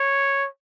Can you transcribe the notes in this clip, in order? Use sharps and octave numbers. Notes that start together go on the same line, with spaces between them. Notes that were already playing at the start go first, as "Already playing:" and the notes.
Already playing: C#5